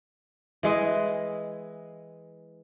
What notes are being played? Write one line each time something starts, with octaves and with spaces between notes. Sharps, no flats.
E3 G#3 D#5